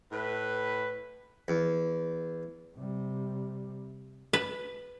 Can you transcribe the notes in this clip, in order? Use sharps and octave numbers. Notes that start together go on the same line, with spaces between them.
A2 B4
E2
C3 G3
B4